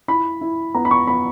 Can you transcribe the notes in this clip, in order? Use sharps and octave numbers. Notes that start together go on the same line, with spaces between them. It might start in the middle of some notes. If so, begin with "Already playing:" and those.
E4 B5
E4
B3 A#5
B5
C#6
B3 B5